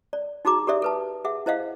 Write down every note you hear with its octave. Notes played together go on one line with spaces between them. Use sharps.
D5
D#4 F#4 G#4 A#5 D6
G4 A4 D5 E5
A4 B4 A5
G#4 E5 F#5
E4 C5 D#5 F5 F#5